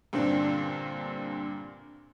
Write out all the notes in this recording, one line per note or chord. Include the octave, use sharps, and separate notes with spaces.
G2 A#2 D3 C4 D4